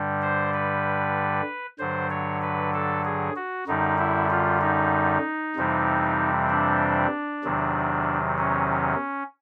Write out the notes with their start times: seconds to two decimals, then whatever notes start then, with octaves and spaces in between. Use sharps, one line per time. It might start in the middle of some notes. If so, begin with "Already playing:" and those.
Already playing: G2 D3 G3
0.22 C5
0.53 B4
1.79 G2 D3 F#3 C5
2.10 C#5
2.42 B4
2.73 A4
3.05 G#4
3.36 F#4
3.67 F#2 D3 G3 D#4
3.99 E4
4.30 F4
4.61 D#4
5.56 F2 C3 E3 G3
6.50 D4
7.44 E2 C3 D#3 F#3
8.39 C#4